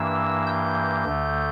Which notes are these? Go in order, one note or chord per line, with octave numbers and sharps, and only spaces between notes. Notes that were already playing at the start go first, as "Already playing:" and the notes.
Already playing: G2 E3 A#3 E6
G6
D2 D3 A3